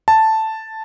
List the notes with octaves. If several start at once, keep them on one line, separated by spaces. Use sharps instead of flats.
A5